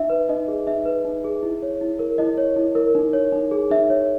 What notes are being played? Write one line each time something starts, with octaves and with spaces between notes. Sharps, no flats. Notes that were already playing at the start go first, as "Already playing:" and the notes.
Already playing: D#4 E5
B4
D#4 D#5
G#4
D#4 E5
B4
D#4
G#4
E4
C#5
E4
A#4
E4 D#5
C#5
E4
A#4
D#4
C#5
D#4
G#4
D#4 E5
C#5